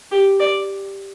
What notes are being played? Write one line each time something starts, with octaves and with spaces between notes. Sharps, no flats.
G4
D5